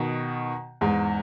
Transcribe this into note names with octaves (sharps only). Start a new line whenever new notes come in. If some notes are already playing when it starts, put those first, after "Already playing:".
Already playing: B2 D#3
E2 G#2